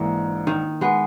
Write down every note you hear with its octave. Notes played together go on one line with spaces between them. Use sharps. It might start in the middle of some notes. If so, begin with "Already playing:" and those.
Already playing: A#1 G#2 E3 A#3
D#3
G#3 B3